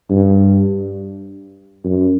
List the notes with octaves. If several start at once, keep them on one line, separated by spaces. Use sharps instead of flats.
G2
F#2